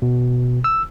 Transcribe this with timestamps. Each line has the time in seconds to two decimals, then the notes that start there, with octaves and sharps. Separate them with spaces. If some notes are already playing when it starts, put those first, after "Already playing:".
0.02 B2
0.64 E6